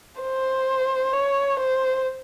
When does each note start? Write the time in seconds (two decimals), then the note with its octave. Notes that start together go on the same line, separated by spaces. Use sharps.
0.21 C5
1.13 C#5
1.59 C5